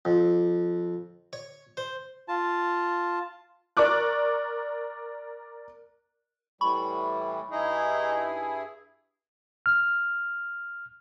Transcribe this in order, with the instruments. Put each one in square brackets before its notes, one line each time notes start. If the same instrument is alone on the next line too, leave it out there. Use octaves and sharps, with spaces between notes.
[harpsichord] F2
C#5
C5
[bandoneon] F4 A5
[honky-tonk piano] A#4 D5 C#6 D6 F#6
[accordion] A2 E3 G3 [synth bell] B5 C#6
[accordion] G2 E4 G#4 [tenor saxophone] D#4
[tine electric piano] F6